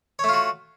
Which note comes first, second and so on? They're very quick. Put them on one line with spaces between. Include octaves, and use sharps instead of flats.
C#5 A3 F4 F#4